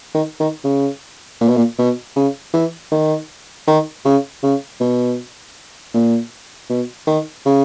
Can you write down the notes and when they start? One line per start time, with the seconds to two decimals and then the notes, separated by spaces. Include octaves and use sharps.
0.14 D#3
0.40 D#3
0.64 C#3
1.41 A#2
1.48 B2
1.57 A#2
1.79 B2
2.16 C#3
2.54 E3
2.92 D#3
3.67 D#3
4.05 C#3
4.43 C#3
4.80 B2
5.94 A#2
6.70 B2
7.07 D#3
7.46 C#3